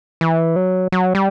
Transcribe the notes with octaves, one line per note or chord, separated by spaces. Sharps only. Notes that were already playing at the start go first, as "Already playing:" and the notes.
E3
F#3
F#3
G3